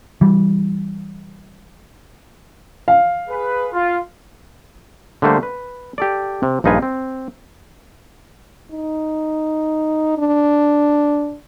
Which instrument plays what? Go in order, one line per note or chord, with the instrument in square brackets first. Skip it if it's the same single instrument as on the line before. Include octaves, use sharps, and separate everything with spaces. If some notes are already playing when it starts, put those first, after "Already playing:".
[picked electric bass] E3 G3
[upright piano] F5
[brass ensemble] G#4 B4
F4
[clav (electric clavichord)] D3 G3 A3 A#3 C5
B4
G4 A4 D5
C3
A#1 G2 D#4 F4 B4 G#5
C4
[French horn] D#4
D4